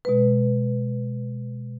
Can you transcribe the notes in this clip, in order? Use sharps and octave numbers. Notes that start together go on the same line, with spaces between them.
B2 G#3 B4